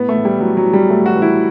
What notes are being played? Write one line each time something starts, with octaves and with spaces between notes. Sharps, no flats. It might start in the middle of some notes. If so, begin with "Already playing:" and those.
Already playing: A2 B3
A3
A2
G3
A2 F#3
F#3
E3
G3
A2 A3
F#4
E3
E4